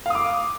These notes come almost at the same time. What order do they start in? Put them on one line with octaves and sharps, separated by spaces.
F5 D#6 D6